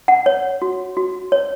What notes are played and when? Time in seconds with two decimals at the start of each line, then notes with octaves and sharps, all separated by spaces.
0.08 F#5
0.26 C#5
0.62 F#4
0.97 F#4
1.32 C#5